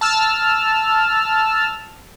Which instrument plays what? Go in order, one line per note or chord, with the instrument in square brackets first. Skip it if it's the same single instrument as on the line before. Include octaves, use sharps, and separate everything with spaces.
[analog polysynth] A5 E6 F6